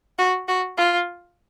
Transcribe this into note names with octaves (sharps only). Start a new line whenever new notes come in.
F#4
F#4
F4